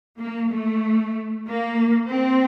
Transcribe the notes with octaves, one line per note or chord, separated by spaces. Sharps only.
A#3
A3
A#3
C4